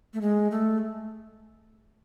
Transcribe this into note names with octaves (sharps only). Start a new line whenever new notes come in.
A3
G#3
A3